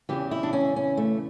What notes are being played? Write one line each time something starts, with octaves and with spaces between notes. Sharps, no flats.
E2 C#3 E3 G4
E4
D4
C#4
C#4
A3